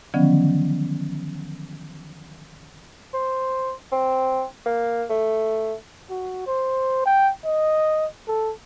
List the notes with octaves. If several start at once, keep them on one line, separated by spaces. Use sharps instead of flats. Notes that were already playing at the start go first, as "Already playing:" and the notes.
D3 D#3 F3 F#3 B3 C#4
C5
C4
A#3
A3
F#4
C5
G5
D#5
A4